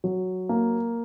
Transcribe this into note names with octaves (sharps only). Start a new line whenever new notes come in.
F#3
A#3